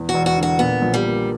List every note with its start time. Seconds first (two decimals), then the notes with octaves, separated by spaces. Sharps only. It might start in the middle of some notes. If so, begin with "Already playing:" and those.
Already playing: E2
0.09 F#4
0.14 E1
0.26 F#4
0.37 D3
0.43 F#4
0.59 A#2 B3
0.82 A#1
0.94 G3
1.04 A#3